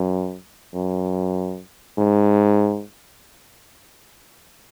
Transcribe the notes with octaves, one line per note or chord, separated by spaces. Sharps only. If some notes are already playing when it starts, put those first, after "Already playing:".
Already playing: F#2
F#2
G#2